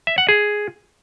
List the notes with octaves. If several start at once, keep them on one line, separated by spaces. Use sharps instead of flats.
E5
F#5
G#4